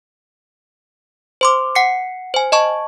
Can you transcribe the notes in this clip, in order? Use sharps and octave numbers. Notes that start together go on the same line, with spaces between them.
C5 C6 D6
F#5 C7 C#7
C5 G#5
D#5 A5 C#6